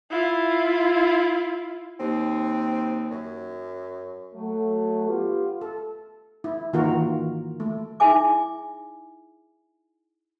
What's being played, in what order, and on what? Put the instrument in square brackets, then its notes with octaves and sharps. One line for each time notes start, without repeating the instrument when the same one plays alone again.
[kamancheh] E4 F4
[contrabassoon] D#2 [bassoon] C4
[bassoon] F#2
[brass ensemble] F#3 A3
B3 F4 G4
[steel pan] A4
E4
D#3 E3 A#3 F4 F#4 A#4
A3
[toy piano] D#4 E4 G#4 E5 G#5 D6